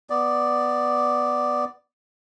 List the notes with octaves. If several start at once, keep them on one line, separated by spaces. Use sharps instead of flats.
B3 D5